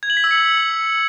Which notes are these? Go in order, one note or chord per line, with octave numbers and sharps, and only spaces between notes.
G#6
F#7
B6
E6
C#7